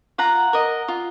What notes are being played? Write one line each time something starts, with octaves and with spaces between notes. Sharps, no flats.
F4 F#5 A#5
A#4 D#5
F4